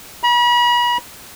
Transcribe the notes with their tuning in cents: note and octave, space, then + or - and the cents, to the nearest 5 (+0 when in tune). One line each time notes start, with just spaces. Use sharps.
B5 -40